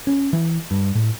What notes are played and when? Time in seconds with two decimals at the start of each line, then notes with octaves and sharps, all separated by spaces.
0.07 C#4
0.33 E3
0.71 G2
0.95 A2